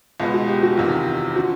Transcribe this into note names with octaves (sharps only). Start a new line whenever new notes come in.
C#2 B2 G#3 B3 F4
F#4
G4
F#4
F#1 E2 C3 D#3 F4
D3 F3 F#4